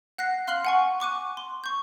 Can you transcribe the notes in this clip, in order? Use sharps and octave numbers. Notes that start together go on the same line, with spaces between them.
F#5 F#6 A#6 C7
F5 C6 F6 F#6 C7 F#7
F#5 G#5 C#6
C#6 D6 F#6 D#7
C6
C#6 G6